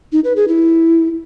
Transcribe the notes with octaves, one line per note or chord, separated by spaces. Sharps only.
D#4
B4
G#4
E4